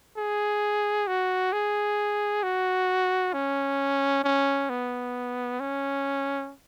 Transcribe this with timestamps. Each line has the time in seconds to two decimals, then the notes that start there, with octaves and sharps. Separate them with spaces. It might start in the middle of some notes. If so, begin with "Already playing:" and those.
0.17 G#4
1.07 F#4
1.53 G#4
2.43 F#4
3.33 C#4
4.24 C#4
4.70 B3
5.60 C#4